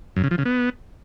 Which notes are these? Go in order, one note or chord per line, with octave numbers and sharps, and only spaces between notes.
F#2
C#3
F3
C#3
B3